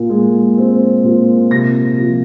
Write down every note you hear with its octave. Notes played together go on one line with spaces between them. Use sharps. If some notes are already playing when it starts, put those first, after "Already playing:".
Already playing: A#2
G#3
C4
A#2
C3 A#6
F3